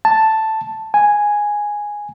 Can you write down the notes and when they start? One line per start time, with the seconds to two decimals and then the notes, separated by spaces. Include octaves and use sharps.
0.05 A5
0.94 G#5